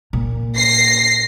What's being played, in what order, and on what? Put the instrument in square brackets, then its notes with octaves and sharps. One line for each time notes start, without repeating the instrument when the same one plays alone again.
[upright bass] A#2
[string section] A#6 C7